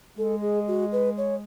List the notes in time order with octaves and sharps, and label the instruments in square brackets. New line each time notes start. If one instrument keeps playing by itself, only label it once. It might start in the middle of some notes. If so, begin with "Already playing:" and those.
[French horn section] G#3 [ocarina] A4
[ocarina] G#4
F#4
B4
C#5